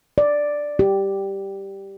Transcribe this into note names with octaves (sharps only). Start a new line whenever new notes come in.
D5
G4